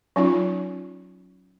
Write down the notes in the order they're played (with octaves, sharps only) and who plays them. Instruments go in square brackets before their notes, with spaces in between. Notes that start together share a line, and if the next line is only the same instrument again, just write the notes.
[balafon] F#3 C#4 D#4 F4